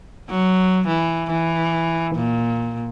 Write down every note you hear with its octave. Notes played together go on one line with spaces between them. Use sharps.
F#3
E3
E3
A#2